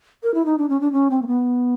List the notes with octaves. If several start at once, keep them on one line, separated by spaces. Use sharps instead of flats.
A#4
E4
D#4
D4
C#4
D4
C#4
C4
A#3
B3